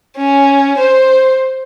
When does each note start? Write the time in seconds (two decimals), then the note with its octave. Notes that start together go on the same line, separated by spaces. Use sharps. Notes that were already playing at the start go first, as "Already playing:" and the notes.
0.18 C#4
0.78 C5